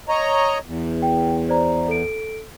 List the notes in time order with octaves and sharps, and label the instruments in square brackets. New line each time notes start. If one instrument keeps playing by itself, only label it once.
[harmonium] C#5 D#5 A#5
E2
[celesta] G5
C5 D5 A#5
A4 D7